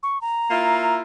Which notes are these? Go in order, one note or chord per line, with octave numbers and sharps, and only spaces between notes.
C#6
A#5
A#3 E4 F4